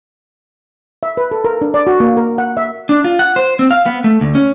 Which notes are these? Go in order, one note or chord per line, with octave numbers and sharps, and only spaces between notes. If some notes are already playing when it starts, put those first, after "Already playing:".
E5
B4
A4
A#4
D4
D5
F#4
A#3
A#4
F#5
E5
D4
F4
F#5
C5
C4
F5
B3
A3
D2
C#4